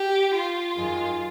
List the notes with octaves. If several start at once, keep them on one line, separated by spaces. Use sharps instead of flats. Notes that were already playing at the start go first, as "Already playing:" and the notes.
Already playing: G4
F4
F#2 D#3 G#3